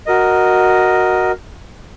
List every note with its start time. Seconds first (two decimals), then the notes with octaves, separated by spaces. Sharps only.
0.06 F#4 A#4 D#5